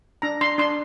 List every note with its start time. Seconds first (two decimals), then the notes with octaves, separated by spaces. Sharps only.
0.22 D4 A#5
0.41 D4 C6
0.58 D4 C6